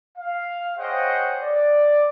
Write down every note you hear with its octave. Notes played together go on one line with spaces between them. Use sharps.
F5
G#4 C5 C#5 D#5 F#5 G5
D5